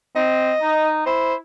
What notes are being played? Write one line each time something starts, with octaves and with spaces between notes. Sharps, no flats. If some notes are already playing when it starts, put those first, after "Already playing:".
C4 D#5
D#4
E4 C5